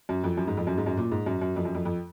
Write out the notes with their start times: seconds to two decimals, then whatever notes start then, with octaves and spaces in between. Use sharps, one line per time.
0.09 F#2
0.24 F2
0.37 F#2
0.48 G#2
0.57 F2
0.67 F#2
0.78 G#2
0.86 F#2
0.97 A#2
1.12 G#2
1.26 F#2
1.42 F#2
1.56 F2
1.65 F#2
1.75 F2
1.85 F2